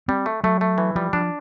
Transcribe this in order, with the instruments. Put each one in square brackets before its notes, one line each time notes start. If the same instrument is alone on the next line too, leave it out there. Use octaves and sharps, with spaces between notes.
[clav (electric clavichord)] G3 [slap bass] C4
[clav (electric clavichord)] A3
[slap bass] F#3 [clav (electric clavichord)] A3
[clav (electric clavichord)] A3
E3
[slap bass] F3 [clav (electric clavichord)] G3
[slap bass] F3 [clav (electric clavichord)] D4